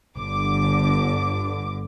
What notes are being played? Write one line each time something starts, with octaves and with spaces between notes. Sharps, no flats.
G1 D3 D6